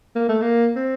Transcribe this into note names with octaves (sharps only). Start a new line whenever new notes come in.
A#3
A3
A#3
C4